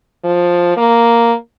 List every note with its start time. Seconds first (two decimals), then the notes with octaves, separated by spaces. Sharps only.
0.24 F3
0.77 A#3